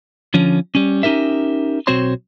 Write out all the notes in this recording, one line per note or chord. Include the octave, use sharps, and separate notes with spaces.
D3 F3 C#4
G3 C#4
C#4 D#4 G4 A#4 E5
B1 C4 F#4 C5 C#5 C6